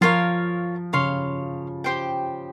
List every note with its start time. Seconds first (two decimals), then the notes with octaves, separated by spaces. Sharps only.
0.01 F3 F4 A#4 C#5 F5
0.93 C#3 C#5 F5 C6
1.84 G4 C5 G5